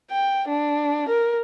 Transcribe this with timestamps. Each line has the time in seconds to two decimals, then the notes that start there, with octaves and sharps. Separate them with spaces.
0.11 G5
0.48 D4
1.08 A#4